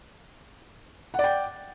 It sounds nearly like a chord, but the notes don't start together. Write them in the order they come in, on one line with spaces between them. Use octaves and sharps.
F#5 D5 G5